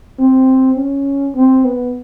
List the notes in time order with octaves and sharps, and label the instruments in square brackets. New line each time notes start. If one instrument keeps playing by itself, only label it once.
[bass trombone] C4
C#4
C4
B3